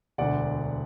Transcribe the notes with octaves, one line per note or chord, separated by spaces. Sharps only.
E1 D2 D3 D5 F#5